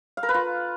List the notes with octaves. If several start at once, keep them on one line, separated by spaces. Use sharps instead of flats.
F5
A#4
B4
F4